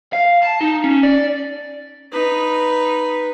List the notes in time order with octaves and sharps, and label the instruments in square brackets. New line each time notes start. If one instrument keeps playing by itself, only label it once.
[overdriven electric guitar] F5
A5
D#4
C#4
D5
[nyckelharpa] D#4 B4